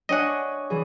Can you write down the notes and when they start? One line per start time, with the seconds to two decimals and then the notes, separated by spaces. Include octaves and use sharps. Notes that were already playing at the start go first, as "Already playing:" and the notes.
0.09 D4 C#5 D#5 F#5 G#5
0.70 E3 G#4